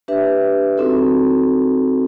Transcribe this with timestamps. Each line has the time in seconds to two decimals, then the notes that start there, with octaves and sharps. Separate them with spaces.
0.08 D4 G4 B4 E5
0.78 C4 D#4 F#4 A4